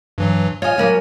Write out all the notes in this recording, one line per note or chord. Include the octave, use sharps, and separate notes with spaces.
G2 E3 F#3
F4 C#5 D#5 G#5
F#3 A#3 C#4